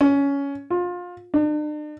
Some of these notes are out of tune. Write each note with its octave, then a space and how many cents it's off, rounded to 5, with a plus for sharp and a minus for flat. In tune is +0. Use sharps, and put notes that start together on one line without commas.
C#4 +15
F4 +25
D4 +45